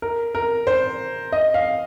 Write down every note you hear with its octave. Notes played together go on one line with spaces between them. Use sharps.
A#4
A#4
C5
D#5
F5